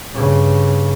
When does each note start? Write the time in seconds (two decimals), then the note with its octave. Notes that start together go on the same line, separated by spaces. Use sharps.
0.13 G2 C#3